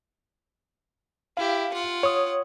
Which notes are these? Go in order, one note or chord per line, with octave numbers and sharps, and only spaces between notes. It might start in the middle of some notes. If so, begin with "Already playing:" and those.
E4 G4 F5
F4 F#5
C#5 D#6